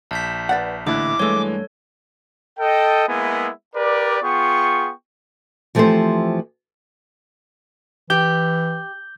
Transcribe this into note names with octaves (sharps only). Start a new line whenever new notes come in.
A#1 A5 G6 B6
B4 D5 F#5
A1 A#2 D3 A3 E4 D6 F#6
G2 E3 G#3 A3 A4 C#5 E6
A4 D#5 G5
G#3 A#3 B3 E4 G#4 E5
G4 A#4 B4 D5
B3 F4 G#4 G5 C#6
E3 F3 A3 C4 G4 C5
E3 G4 G6